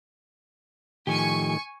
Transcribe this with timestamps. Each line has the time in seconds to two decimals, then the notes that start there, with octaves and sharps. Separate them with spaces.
1.07 A2 D#3 F3 G4 G#5 C#6